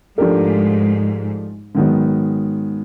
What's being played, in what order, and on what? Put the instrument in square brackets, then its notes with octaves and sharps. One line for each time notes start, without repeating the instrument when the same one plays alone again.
[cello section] G#2 [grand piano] F3 A3 D4 G4 A#4
[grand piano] G#2 D#3 F#3 B3